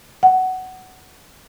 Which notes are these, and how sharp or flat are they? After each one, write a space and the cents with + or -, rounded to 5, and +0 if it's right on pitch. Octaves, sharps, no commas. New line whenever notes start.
F#5 +10